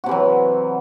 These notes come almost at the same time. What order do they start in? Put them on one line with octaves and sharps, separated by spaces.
F#4 C3 E3 F#3